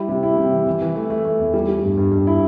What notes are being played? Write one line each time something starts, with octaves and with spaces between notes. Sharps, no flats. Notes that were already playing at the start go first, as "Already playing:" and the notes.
Already playing: G3 E4
C3
E4
C3
E3
E3
E3
A3
A3
A3
E2
G3
G3
G2
G2
G2
E4